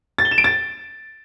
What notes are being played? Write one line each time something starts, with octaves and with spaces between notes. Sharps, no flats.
A6
G7
E7
D7
A6